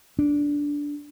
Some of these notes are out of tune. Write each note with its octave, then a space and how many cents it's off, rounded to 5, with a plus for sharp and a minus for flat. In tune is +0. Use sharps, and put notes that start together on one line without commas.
D4 -10